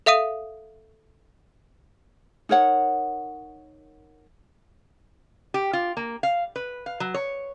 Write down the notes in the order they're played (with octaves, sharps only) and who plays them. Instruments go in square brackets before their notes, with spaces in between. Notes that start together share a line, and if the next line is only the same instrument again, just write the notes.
[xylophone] A4 E5 F5 D#6 D#7
[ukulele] D#4 A#4 C#5 F#5
[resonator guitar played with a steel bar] G4
F4
A#3
F5
B4
F5
F#3
C#5